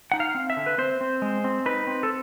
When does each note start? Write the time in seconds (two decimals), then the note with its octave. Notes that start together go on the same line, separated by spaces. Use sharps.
0.12 D#4 F#5
0.20 F5
0.35 C4
0.50 E5
0.57 D3
0.66 B4
0.78 C4 C5
1.01 C4
1.22 G#3
1.44 C4
1.66 D#4 B4
1.87 C4
2.03 A4